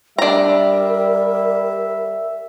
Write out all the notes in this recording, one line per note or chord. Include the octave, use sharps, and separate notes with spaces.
G3 D4 A#4 E5 A#5